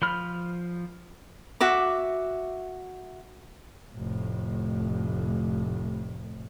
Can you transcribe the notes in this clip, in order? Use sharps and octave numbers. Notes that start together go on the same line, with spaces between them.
F3 C5 B5 F6
F#4 E5 D6
F1 A2